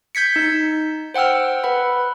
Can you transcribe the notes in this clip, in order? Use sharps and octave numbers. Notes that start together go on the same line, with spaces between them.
G6 G#6 B6 C#7
D#4
C5 F#5 G5 E6 F6
B4 F#5 B5